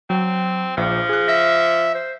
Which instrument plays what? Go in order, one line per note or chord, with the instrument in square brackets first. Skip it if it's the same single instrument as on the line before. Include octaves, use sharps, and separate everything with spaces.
[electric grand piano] F#3 [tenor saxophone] C4
[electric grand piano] A#1 [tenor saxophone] F3
[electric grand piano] G#4 F#6
[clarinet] E5 [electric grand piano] A#6
[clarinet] C5